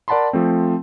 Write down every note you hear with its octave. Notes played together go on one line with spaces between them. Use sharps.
A#4 D5 F#5 A5 B5 C6
F3 A3 C4